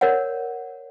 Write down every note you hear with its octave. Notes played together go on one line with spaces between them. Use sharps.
A#4 C#5 D5 F#5